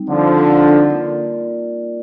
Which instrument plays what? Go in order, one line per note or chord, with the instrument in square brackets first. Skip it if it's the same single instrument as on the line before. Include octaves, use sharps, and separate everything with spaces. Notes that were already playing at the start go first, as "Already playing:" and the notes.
Already playing: [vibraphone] G3 C4 D#4
[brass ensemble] D3 F3
[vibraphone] A#3 F4 A#4 D5